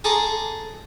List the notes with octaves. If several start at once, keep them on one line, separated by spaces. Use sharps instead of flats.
G#4 A4 A#5 C6 D6